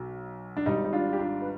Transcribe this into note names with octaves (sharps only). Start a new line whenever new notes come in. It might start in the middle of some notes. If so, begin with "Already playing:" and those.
Already playing: B1 B2
D4
G#1 G#2 G3 D#4
D#4
D4 F4
G4
D4 F4
B4